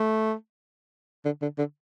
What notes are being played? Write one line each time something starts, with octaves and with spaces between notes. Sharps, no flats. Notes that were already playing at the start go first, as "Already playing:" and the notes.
Already playing: A3
D3
D3
D3